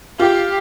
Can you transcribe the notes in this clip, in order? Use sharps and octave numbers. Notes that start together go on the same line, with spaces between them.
F4 G4